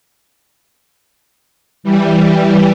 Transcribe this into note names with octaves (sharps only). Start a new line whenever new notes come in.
E3 G3